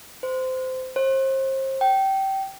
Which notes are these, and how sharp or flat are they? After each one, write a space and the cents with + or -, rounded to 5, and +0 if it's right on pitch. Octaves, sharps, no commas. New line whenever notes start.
C5 -20
C5 +35
G5 -20